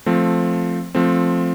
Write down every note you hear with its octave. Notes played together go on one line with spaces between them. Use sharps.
F3 A3 C4
F3 A3 C4